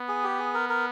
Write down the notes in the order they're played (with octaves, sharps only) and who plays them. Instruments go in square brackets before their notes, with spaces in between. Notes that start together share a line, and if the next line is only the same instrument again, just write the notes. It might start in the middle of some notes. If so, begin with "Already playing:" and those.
Already playing: [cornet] B3
[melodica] G#4
G4
G#4
A#4
A#4